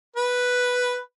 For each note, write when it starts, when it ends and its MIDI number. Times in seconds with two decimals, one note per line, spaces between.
0.16 0.97 71